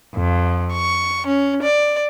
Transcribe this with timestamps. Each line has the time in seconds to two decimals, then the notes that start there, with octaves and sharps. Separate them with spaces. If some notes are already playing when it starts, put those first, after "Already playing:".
0.14 F2
0.73 C#6
1.27 C#4
1.62 D5